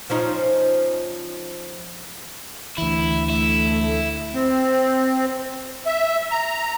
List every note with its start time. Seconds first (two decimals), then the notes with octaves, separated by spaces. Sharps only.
0.10 F3 C#4 D#4
2.78 D2 D3 E3 E4
3.30 A3 E4
4.34 C4
5.86 E5
6.31 A#5